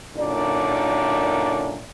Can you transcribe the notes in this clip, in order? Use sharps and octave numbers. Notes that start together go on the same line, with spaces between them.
F#2 A#2 D3 D#4 D5